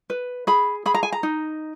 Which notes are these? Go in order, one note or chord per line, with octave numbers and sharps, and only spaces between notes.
B4
G#4 B5
G#4 B5
A#5
G#5
A#5
D#4